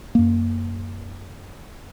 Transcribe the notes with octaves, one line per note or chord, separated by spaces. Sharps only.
F#2 A#3